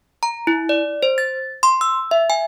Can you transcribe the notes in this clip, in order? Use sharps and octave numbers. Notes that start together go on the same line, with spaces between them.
A#5
E4
D5
C5
A6
C6
E6
E5
G#5